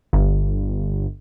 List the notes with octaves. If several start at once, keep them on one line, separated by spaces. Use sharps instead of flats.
G1